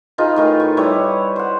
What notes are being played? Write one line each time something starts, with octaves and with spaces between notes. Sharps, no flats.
D#4 F4 G#4 B4
A2 D#3 B4
C#6
G3 E4 B4 C#5
C5 F#5